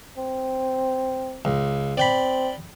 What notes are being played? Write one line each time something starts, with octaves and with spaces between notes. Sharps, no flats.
C4
C#2
C4 D5 G5 B5